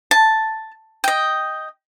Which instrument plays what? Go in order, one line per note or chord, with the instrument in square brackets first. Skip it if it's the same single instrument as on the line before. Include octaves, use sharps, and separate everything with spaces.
[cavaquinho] A5
D#5 G5